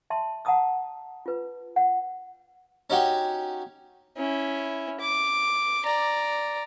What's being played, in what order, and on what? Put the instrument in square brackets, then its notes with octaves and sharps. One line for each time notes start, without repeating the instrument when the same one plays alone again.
[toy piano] E5 A5 C6
F#5 A5 A#5 D#6 E6
F4 B4
F#5
[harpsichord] C#4 D#4 F#4 G4 G5
[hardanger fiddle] C#4 E4
D6
D5 A#5